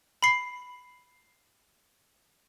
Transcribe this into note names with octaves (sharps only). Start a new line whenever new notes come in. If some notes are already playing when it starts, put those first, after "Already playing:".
B5 C7